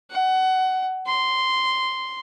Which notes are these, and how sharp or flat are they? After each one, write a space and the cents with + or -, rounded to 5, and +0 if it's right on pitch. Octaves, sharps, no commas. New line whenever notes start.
F#5 +20
C6 -5